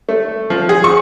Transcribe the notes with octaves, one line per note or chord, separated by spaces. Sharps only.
A3
F3
G#4
C#6